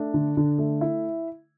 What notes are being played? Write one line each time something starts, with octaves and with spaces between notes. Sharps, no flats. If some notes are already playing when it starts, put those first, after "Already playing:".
Already playing: A3 D4
D3
D3
A3
E4